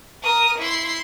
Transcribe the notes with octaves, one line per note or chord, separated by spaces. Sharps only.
A#4 D#6
E4 C6